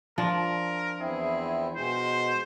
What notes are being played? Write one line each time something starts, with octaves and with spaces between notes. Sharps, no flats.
F3 D4 A#4
E2 C4 E4 G#4
B2 G#3 C5